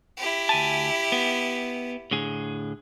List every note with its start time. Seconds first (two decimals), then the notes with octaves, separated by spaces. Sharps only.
0.17 E4 G4
0.49 D2 G#5 A5
1.12 B3
2.11 A2 D3 G#4